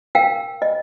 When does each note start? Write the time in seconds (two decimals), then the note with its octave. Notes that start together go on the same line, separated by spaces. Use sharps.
0.15 A#4 F5 G5
0.62 D#5